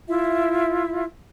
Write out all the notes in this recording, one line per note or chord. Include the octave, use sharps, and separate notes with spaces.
E4 F4 E5